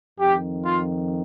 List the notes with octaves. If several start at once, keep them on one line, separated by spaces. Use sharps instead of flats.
F2 D#3 G4
F4